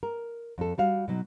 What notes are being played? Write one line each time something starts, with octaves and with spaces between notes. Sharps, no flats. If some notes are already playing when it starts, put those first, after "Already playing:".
A#4
F2 A4
G3 F#4 F5
B2 F#3 D#4